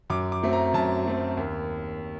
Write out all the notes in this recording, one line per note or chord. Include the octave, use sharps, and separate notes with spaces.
F#2 D6
D6
F#3 A3 C4
A#5
F#2 A5
F#3 A3 C4
D#2